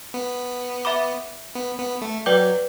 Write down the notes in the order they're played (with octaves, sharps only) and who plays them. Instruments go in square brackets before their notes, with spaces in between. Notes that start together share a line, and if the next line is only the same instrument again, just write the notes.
[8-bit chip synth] B3
[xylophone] E5 B5 D6
[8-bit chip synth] B3
B3
A3
[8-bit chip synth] F#3 [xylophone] B4 D5 G5 D6 G6